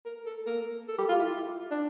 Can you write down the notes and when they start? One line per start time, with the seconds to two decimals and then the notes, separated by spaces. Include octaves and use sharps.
0.06 A#4
0.26 A4
0.47 A#4
0.88 A4
0.99 G4
1.09 F4
1.19 E4
1.71 D4